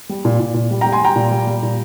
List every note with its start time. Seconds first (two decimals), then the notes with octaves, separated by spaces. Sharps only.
0.09 G3
0.25 A#2
0.40 A#2
0.54 A#2
0.71 G3
0.81 G3 G5 A#5
0.93 G#5 C6
1.01 G3 G5 A#5
1.16 A#2
1.31 G3
1.47 G3
1.63 A#2